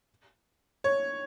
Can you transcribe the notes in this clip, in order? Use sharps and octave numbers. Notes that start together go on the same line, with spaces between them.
C#5